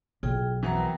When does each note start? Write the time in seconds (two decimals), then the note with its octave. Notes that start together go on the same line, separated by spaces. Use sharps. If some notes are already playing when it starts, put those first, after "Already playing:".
0.23 B1 F4 G#4 G5
0.63 F2 B2 E3 B4 F#5 A#5
0.77 A#4 G5